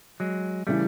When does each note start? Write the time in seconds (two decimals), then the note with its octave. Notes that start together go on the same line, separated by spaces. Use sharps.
0.20 F#3 G#3
0.67 C#3 E3 G3 A3